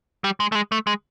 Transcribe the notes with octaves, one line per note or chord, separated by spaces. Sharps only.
G3
G#3
A3
G#3
A3
G#3